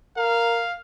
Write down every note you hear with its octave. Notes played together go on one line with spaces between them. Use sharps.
A#4 F5